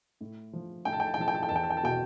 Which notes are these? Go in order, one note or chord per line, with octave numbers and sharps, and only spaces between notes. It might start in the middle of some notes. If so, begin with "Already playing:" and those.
A2
F3
A2 G5
A5
G5
A5
G5
F3 A5
G5
A5
G5
E2 A5
G5
A5
G5
A5
B2 G5